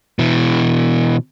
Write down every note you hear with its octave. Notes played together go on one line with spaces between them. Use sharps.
B2 E3